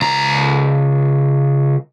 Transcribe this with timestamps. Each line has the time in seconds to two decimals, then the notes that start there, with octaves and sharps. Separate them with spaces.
0.02 C#2 A#5